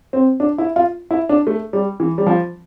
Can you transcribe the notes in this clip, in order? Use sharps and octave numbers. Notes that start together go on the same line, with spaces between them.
C4
D4
E4
F4
E4
D4
A3
G3
E3
G3
F3